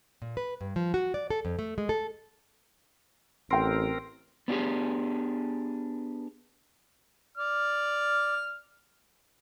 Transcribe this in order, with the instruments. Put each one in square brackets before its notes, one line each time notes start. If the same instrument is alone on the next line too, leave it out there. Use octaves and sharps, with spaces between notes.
[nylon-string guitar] A#2
B4
G2
F3
F#4
D5
A4
F2
A3
G#3
A4
[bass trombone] A1 [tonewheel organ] C4 A#4 [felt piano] G5 C6
[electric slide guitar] B3 D4 E4 F4 G4 G#4
[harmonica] D5 F6